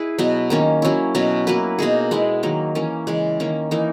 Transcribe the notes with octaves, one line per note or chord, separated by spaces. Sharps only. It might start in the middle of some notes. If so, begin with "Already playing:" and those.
Already playing: E4 G#4 B4
B2 F#3 B3
D#3 A#3 C#4
F#3 C#4 E4
B2 F#3 C#4
F#3 A#3 E4 B4
B2 A#3 D#4 G#4
G#3 B3 E4
D#3 F#3 A#3
E3 A#3 C#4
C#3 E3 G#3
D#3 A#3 C#4
E3 A#3 D#4